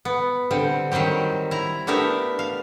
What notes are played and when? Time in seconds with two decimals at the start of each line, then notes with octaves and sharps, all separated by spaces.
0.05 B3
0.51 D3 G3 C4
0.92 D#3 F#3 G3 C4 G4
1.51 E4 A#5
1.87 A3 B3 D4 G4 A#4 E5
2.39 F5